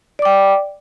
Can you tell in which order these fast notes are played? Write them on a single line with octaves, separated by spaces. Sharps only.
D5 D6 G5